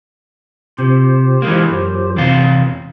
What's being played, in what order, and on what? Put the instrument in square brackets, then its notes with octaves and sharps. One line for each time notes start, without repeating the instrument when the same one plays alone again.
[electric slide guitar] C3 [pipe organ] F4 G4 C5
[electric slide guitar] E3 G#3 A#3
F#2
E2 C3 F4